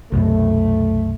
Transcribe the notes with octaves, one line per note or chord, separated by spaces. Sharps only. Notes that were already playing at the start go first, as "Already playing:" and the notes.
C2 F#2 B2 A3